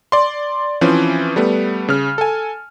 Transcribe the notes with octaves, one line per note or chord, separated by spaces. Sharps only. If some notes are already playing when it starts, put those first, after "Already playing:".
D5 C6
E3 F3 C4 C#4
G3 A3 B3
C#3 F6
A4 G#5